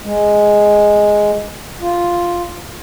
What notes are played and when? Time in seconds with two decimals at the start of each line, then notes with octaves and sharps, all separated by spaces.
0.04 G#3
1.81 F4